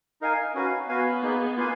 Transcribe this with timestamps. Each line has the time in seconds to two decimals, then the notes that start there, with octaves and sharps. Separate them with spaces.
0.21 D#4 A#4 F5 G#5
0.54 C#4 F#4 B4 F5 G#5
0.88 B3 F#4 B4 F5 G#5
1.22 A#3 D#4 G#4 B4
1.57 A#3 F4 B4 F5 G#5